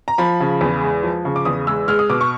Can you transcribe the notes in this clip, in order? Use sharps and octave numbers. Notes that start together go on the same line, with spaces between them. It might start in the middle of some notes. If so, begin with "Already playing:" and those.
A#5
F3 B5
C#3
E2
G#3
F3
C#3
D6
E2 D#6
G#3 E6
G#3 F6
D#6
B2 D6
C#6